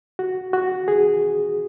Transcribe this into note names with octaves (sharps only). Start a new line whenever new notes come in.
F#4
F#4
G#4